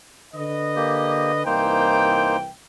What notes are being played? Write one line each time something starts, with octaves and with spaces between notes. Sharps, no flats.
D3 B4 D#5
A#3 G4
C2 E3 A#3 D#4 C5 G5